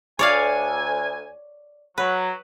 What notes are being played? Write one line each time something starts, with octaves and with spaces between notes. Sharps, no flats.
D2 C#5 D5 F5 G#5
F#3 B4